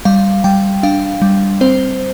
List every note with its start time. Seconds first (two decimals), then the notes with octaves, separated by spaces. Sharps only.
0.05 G3 F5
0.44 G3 G5
0.83 D4 F5
1.22 G3
1.61 C4 C5